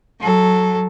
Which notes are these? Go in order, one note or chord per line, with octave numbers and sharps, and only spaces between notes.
F#3 A4